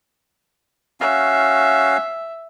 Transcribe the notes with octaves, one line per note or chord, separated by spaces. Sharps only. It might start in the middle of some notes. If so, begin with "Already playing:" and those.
C#4 F#4 E5 F5